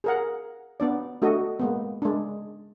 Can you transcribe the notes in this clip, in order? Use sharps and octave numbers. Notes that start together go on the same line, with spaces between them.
G#4 A#4 F#5
B3 D4 D5
A3 D4 F#4 A4 D#5
G#3 A#3 B3
G#3 D4